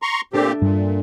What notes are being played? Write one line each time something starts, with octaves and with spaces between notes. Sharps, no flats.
A#5 C6 C#6
A#2 A3 C4 D4 G4
G2 A#2 G3